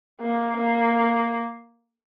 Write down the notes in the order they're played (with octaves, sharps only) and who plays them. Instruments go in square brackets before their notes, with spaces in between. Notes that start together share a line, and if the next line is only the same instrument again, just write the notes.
[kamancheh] A#3
A#3